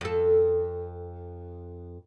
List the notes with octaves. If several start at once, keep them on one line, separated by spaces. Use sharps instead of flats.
F2 A4